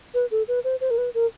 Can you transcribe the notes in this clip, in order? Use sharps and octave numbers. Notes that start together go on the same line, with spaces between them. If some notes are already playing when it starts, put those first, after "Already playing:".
B4
A4
B4
C5
C5
A#4
B4
A#4